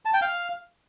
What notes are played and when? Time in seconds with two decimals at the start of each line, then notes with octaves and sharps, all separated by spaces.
0.05 A5
0.13 G5
0.22 F5